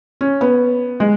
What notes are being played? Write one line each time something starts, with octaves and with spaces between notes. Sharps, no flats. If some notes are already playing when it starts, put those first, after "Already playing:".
C#4
B3
G#3